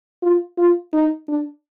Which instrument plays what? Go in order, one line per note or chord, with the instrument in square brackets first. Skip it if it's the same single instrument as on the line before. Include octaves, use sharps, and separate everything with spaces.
[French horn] F4
F4
D#4
D4